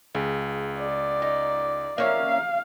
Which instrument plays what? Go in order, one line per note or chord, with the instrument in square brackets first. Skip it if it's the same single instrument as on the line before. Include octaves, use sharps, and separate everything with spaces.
[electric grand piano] C#2 [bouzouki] C#3
[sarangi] D5
[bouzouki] D#4
[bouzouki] A#3 C#4 E5 [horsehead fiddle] F5